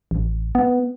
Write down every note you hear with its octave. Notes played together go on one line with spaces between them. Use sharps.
A1
B3